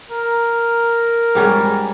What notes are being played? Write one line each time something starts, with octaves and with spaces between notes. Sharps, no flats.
A#4
G#2 G3 C#4